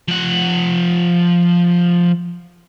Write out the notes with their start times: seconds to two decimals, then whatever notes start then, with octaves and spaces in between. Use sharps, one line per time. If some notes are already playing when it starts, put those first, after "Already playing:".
0.08 F3 F#5